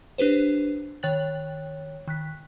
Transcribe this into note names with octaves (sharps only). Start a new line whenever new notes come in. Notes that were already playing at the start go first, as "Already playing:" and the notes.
D4 G4 B4 C5
D#3 C#5 G5 F#6 A6 F#7
D#3 F#6 B6